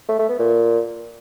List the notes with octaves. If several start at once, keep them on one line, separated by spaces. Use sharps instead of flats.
A3
A3
B3
A#2